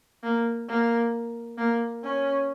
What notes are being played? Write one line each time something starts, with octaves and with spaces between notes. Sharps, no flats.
A#3
A#3
A#3
C#4